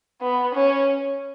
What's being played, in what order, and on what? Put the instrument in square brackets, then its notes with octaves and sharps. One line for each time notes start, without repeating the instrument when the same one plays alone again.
[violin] B3
C#4